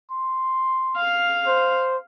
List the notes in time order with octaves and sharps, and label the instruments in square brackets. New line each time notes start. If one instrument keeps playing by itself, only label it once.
[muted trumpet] C6
[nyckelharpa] F5
[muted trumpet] C5